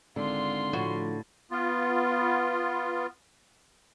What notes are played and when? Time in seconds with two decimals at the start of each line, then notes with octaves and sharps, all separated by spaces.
0.16 G#1 D3 F4 C6
0.73 A2 F3 F#4
1.51 B3 F4